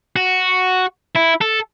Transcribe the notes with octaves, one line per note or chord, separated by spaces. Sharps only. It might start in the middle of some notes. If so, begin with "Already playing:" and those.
F#4
E4
A4